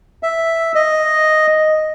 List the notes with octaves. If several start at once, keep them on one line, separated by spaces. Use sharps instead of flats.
E5
D#5